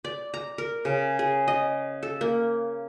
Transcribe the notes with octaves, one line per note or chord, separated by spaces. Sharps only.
D5
A#5
A#4
C#3
G#4
D#5
A4
A#3